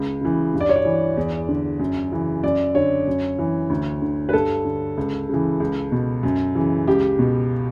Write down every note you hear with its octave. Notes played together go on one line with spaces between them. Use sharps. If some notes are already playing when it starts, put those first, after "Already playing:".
Already playing: C#2
C#3 E3
G2
D5
C#5
D5
E3
E2
D3
F#2
C#3 E3
F#2 D5
D3 C#5
F#2
E3
D2
D3
B4
G2 A4
D3
C#2
C#3 E3
C#2
B2
F#2
C#3 E3
C#2 G4
B2